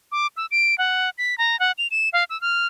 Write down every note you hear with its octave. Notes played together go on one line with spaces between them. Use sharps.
D6
E6
D7
F#5
B6
A#5
F#5
F7
E7
F5
E6
F6